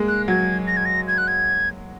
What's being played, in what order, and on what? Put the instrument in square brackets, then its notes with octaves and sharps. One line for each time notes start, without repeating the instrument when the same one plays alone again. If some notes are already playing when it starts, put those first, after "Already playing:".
Already playing: [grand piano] G#3 A#3
[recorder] F#6
[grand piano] F#3 [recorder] G#6
[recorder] A#6
G#6
A#6
G#6
F#6
G#6